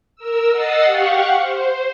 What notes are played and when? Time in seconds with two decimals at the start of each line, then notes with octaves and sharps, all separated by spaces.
0.16 A#4 E6
0.50 D#5 F#5 D#6 E6 A6 C7
0.84 G4 F5 F#5 C#6
1.39 C5